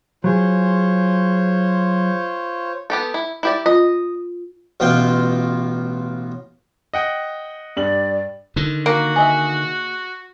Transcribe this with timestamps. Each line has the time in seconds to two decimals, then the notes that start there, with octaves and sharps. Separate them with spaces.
0.24 F#3 F4 G#4 C5 C#5
2.90 B3 G4 A4
3.14 E4
3.43 E4 G4 D5
3.66 F4 D#5
4.80 A1 B2 F4 G5
6.94 D#5 F#5 G5
7.77 G2 G4 D5 F#7
8.56 D3 D#3
8.86 A#3 F#4
9.16 G#4 D#5 E5